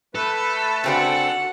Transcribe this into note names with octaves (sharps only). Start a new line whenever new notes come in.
A3 A4 B4
C#3 C4 D4 F#4 F#5